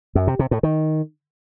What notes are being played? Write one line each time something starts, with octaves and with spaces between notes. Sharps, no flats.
F#2
C3
C3
A2
D#3